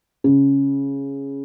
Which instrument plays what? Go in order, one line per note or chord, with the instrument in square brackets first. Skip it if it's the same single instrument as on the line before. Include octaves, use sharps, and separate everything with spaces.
[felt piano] C#3